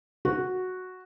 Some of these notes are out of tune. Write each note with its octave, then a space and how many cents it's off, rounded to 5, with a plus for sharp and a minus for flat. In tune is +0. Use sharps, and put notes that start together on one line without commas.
F#4 -5